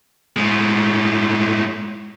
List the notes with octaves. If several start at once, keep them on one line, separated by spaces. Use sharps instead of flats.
A2 G#3